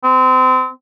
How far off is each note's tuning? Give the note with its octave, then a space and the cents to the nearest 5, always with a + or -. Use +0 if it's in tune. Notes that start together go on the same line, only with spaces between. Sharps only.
C4 -30